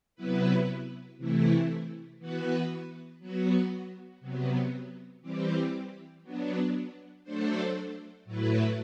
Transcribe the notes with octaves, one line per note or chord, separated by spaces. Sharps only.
C3 F#3 B3 E4 B4
C3 E3 A3 E4
E3 B3 F#4 B4
F#3 B3 F#4
C3 F#3 B3
E3 G3 C4 G4
F#3 B3 D4
F#3 A3 D4 A4 C5
A2 F#3 A3 E4 B4